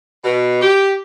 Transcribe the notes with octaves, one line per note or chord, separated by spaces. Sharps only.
B2
G4